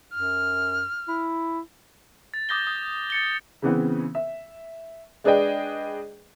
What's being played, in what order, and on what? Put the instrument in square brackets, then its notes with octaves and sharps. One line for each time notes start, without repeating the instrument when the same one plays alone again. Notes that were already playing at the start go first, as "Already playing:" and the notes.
[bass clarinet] F#2 [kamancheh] F6
[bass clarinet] E4
[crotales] A6
D6 D#6 G6 A#6 G7
D#6
A6 C#7 G7
[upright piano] C#3 E3 B3 C4
E5
G#3 D4 G#4 B4 D#5 G5